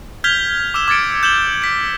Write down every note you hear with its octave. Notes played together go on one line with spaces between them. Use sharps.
F6 G6 G#6 B6 F7 G7
D6 E6 E7 G7
D6 G#6 A6 C#7 D7
G6 E7 F#7 G7
B6 D7